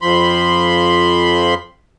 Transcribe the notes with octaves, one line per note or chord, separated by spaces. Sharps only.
F2 F3 B5 C6